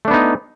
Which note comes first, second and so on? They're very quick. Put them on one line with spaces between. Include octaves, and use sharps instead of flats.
A3 D4 B3 D#4